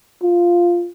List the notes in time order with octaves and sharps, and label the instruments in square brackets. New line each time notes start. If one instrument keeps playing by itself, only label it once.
[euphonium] F4